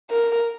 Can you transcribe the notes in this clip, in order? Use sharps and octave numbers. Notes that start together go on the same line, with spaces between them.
A#4